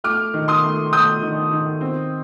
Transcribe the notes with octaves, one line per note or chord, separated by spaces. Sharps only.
A3 D6 F6
D#3
C6 D#6
A3
A3 D#6 G6
D#3
D#3
C4